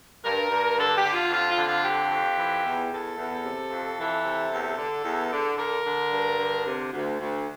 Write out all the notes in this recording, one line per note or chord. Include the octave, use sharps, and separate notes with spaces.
G2 A#4
G2
D3 A4
G4
D3
F4
F2 F4
F4
D3
F4
F2 G4
F2
E3
E2
E2 A4
E2
C3
F2
E3 A4
C3
E2
D3
E2
D3
D3 A#4
D3
G2
D3
C3
D2
D2